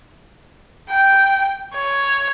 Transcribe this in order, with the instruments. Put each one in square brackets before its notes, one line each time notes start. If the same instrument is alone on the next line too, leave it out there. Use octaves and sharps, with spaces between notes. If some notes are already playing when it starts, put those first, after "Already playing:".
[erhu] G5
C#5